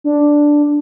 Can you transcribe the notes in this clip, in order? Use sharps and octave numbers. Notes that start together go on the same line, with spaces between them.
D4